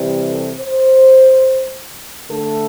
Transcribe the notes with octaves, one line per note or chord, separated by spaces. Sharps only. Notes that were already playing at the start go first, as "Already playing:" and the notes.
Already playing: C3 E3 G3
A4
C5
D3 A3 A4